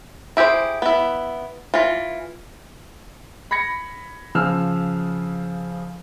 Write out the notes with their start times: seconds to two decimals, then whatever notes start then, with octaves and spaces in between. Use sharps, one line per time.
0.37 E4 G4 G#4 C5
0.82 B3 E4
1.74 E3 F4
3.51 B5 G#6 A#6 C#7
4.35 C#3 F3 G#4 E6 F6